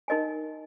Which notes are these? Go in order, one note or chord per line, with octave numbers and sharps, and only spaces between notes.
D#4 A#4 D#5 G#5